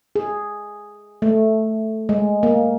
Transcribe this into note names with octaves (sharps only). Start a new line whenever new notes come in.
G#4
A3
G#3
A#3